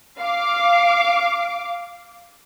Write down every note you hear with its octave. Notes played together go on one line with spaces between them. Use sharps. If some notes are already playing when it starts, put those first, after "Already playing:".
F5 D6